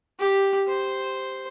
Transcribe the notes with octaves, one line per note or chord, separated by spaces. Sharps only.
G4
C5